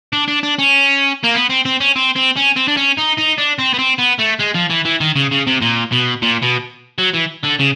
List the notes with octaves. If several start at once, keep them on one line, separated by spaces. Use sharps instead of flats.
D4
D4
D4
C#4
A#3
B3
C4
C4
C#4
C4
C4
C#4
C4
D4
C#4
D#4
D#4
D4
C4
B3
C4
B3
A3
G#3
F3
E3
E3
D#3
C#3
C#3
C3
A#2
B2
A#2
B2
F#3
E3
D3
C#3